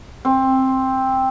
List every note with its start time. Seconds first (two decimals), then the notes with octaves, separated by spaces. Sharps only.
0.25 C4